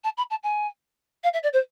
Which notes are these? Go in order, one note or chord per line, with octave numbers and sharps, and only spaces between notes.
A5
B5
A5
G#5
F5
E5
D5
C5